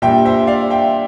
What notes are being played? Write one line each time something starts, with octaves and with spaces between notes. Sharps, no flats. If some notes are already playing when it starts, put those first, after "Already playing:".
A#2 G3 D4 E5 G5
C5 E5
D5 F5
E5 G5